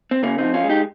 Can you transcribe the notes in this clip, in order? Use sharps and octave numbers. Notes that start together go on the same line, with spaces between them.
C4
C#3 A#3 C#4
F3 C4 D#4
C#4 F4
G#3
D#4 G4